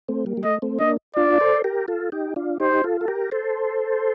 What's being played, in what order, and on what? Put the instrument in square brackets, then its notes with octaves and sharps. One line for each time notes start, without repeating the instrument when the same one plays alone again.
[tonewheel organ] A3 C4
G3 A#3
G3
[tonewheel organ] A3 [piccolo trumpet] D#5
[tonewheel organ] A3 C4
[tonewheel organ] A#3 D4 [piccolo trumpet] D#5
[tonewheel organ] D4 F4 [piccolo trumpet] D5
[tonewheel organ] A4 C5
G4 A#4
F4 A4
D#4 G4
D4 F4
[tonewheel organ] D#4 G4 [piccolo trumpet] C5
[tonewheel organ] F4 A4
A4
G4 A#4
A4 C5